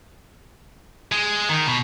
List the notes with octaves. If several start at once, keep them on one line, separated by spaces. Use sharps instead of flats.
G#3
D#3
B2